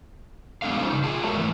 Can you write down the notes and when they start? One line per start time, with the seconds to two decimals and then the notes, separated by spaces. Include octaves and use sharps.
0.62 F#3 G#3 B3 D4 A4 F5
0.77 G3 C#4 D#4 F4 A4 C5
0.89 C#3 D#4
1.03 F4 G#4 A5
1.24 G#3 F#4 A4 A#4 C#5 E5
1.36 G#2 E3 A3